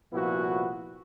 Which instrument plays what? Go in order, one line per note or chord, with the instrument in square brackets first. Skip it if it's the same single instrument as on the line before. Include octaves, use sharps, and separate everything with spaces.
[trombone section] C2 A#2 F3 B3 E4 F#4